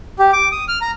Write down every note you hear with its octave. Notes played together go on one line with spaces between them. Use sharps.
G4
D6
D#6
F6
A#5